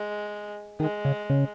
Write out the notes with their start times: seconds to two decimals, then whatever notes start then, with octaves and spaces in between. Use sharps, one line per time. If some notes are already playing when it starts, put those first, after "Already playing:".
Already playing: G#3
0.80 D#3 G#3
1.05 C#3
1.30 C#3